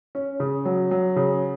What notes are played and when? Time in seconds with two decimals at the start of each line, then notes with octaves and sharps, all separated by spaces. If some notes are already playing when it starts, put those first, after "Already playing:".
0.15 C#4
0.40 C#3
0.65 F#3
0.91 F#3
1.16 C#3